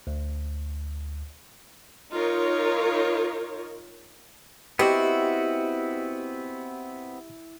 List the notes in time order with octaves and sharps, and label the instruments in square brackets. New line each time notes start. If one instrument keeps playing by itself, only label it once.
[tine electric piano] D2
[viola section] D#4 F4 A#4 C#5
[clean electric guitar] B3 C4 F#4 [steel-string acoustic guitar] E4 [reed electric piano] G4 D#5